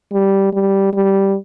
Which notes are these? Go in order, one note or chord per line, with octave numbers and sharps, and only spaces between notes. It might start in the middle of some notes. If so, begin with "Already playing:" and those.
G3
G3
G3